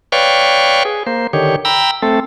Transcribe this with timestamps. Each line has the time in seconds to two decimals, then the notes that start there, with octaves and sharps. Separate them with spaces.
0.12 B4 C#5 D5 F5 G5 C#6
0.85 G#4
1.07 A#3 C5
1.33 D3 D#3 G4 C#5
1.65 G5 A#5 B5 E6
2.02 A3 C4 A4